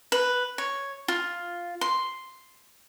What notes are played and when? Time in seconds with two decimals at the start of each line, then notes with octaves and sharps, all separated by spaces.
0.12 B4
0.58 C#5
1.08 F4
1.81 C6